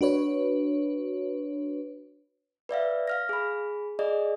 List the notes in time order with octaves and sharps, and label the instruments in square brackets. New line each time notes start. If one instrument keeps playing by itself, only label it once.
[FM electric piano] D4 F#4 B4 C#5
[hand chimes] B4 D5 E5 F5
F5 F6 A#6
G#4 B5
G#4 D5 D#5